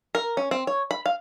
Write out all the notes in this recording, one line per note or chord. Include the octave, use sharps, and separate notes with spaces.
A#4
C#4
C4
C#5
B5
F5